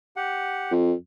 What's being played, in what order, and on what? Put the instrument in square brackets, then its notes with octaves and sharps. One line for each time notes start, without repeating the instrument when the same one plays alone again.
[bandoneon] G4 F#5
[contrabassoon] F2